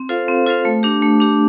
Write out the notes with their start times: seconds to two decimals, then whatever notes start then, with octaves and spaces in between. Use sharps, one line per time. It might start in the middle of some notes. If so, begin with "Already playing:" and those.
Already playing: C4
0.09 F4 A4 C5 F5
0.28 C4
0.46 F4 A4 C5 F5
0.65 A3
0.83 D4 G4
1.03 A3
1.20 D4 G4